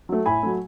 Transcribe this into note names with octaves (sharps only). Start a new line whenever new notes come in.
F#3 A3
A2 G#5 B5
F#3 A3